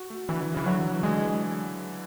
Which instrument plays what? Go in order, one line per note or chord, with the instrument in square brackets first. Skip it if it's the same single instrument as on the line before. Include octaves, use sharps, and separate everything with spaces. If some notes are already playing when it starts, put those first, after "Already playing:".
Already playing: [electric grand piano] F#4
A3
[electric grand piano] D3 [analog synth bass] E3
[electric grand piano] E3
[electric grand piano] C#3 [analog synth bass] E3
[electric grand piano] D3 [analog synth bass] F#3
[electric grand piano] F#3
E3
[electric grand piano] D3 [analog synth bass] G#3
[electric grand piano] E3